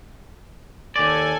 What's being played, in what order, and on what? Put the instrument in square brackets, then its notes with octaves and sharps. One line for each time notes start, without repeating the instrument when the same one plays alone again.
[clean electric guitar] D#2 D5 [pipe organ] A4 G#5